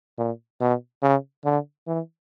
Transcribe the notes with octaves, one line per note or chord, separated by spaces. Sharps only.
A#2
B2
C#3
D3
E3